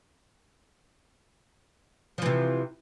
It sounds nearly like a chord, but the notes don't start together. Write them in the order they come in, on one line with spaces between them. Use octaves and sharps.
F3 E3 C3